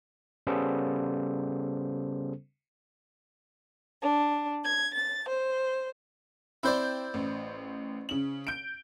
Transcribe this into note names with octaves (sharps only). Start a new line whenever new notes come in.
C#3 G3 B3 C#4 A4 C5
D4
G#6
A6
C5
C4 E4 C5 D5 G6
A1
C#3 F#7
G6 D7